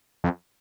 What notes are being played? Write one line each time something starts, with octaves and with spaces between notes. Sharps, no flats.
F2